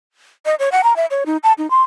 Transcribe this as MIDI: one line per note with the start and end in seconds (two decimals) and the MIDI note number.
0.46 0.55 75
0.59 0.69 73
0.72 0.82 78
0.84 0.96 82
0.96 1.06 76
1.11 1.24 73
1.26 1.37 63
1.43 1.53 81
1.58 1.69 63
1.70 1.82 84